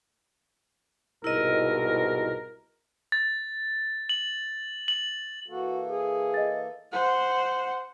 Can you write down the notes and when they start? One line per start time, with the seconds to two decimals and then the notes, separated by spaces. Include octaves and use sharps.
1.24 C2 G#2 B2 E4 A#4 D#5
3.12 A6
4.09 F#7
4.88 F#7
5.48 E3 A#3 F#4 A4
5.89 G#4
6.34 D#5 A6
6.92 C5 F#5